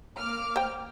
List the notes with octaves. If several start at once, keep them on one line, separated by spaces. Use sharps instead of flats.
A#3 D6 F6
C5 G5